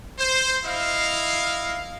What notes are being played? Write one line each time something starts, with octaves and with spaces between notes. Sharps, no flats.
C5
E4 D#5 F5